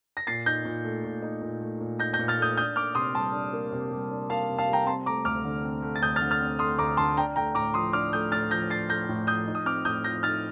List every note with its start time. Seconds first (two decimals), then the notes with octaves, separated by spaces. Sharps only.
0.17 A#6
0.27 A#2 A6 C7
0.46 D#4 G6 A#6
0.65 A#2
0.84 A3
1.04 A#2
1.22 D#4
1.42 A#2
1.61 A3
1.80 A#2
1.99 D#4 G6 A#6
2.13 G6 A#6
2.19 A#2
2.28 F6 A6
2.38 A3 D#6 G6
2.57 D4 D#6 G6
2.76 A#3 D6 F6
2.95 C3 C6 D#6
3.14 G3 A5 C6
3.33 D4
3.53 A#3
3.72 C3
3.92 G3
4.11 D4
4.30 A#3 F5 A5
4.49 C3
4.58 F5 A5
4.68 G3
4.73 G5 A#5
4.87 C4 A5 C6
5.06 A3 A#5 D6
5.25 D2 D6 F6
5.45 D3
5.64 C4
5.82 A3
5.96 A6
6.01 D2 D#6 G6
6.16 F6 A6
6.21 D3
6.31 F6 A6
6.40 C4
6.59 A3 C6 D#6
6.78 D2 A#5 D6
6.97 D3 A5 C6
7.17 D4 G5 A#5
7.36 A3 G5 A#5
7.55 A2 A#5 D6
7.74 F3 C6 D#6
7.93 D4 D6 F6
8.13 A3 D#6 G6
8.32 A2 F6 A6
8.51 F3 G6 A#6
8.70 D4 A6 C7
8.90 A3 G6 A#6
9.09 A2
9.27 F3 D#6 G6
9.47 D#4
9.55 D#6
9.66 C4 D6 F6
9.85 A2 D#6 G6
10.04 F3 G6 A#6
10.23 D#4 F6 A6